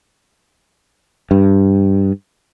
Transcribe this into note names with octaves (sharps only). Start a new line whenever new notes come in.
G2